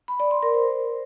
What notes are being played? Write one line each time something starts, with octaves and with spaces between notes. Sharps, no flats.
B5
D5
C6
A#4
C5